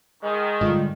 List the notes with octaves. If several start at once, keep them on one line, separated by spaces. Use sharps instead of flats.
D#3 G#3
G#2 D3 G3 F4 D#5